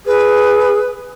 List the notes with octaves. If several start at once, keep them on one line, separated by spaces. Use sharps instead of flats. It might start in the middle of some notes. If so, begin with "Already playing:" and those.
G#4 B4